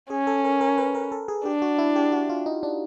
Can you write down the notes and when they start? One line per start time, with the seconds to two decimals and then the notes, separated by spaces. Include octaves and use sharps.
0.10 C#4 G#4
0.27 A4
0.45 A#4
0.61 A#4
0.78 B4
0.95 A#4
1.12 A4
1.28 G#4
1.45 D4 G4
1.62 F#4
1.78 E4
1.96 G4
2.12 F#4
2.29 F4
2.46 D#4
2.63 D4